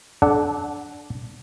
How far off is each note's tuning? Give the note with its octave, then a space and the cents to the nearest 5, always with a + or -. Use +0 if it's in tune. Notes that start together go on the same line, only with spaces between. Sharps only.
D4 -5 A4 -30 F#5 +0